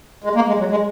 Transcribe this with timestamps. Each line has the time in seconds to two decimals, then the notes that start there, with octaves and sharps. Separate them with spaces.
0.24 G#3
0.35 A#3
0.48 G#3
0.59 F#3
0.71 G#3